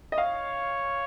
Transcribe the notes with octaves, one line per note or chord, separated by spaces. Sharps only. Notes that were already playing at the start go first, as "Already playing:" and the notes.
D#5
C#5 F5